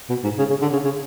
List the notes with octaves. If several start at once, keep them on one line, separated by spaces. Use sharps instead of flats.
B2
G#2
C#3
C#3
D3
C#3
C#3